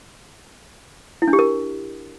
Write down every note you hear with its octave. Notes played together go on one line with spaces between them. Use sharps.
E4
D4
G4
A#4